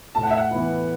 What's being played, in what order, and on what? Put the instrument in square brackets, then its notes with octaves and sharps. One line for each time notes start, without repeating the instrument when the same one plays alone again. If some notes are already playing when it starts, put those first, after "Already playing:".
[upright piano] A2 [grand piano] A5
[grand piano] F#5
E5
F#5
[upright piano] E3 B3 E4